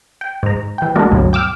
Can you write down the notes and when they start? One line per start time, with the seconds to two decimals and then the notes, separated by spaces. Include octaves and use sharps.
0.21 G5
0.43 G#2 A#5
0.78 E3 G5
0.96 G#3 A3 D4 F#4 A#4
1.11 D2 G2 B2 F#3
1.33 G5 D6 E6 F6